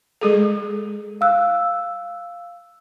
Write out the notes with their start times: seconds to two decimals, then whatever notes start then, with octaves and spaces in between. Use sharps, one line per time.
0.21 G#3 G#4 A4
1.21 F5 E6 F#6